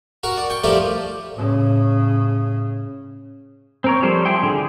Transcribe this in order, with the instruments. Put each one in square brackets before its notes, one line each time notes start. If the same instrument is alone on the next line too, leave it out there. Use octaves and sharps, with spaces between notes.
[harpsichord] F#4 A#4 C#6
D5
G5 C#6
F3 G3 A3 G4 A#4 D5
[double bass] A2 C#3
[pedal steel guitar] C4 A#4 C#5
F3 G3 A4 C5
E4 G#4 G5 C6
D3 G#4